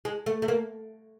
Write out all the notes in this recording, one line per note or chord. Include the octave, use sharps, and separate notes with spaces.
G#3
A3
A3
A#3